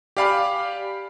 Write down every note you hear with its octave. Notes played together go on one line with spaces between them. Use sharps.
G4 D5 F5 G#5 B5 F6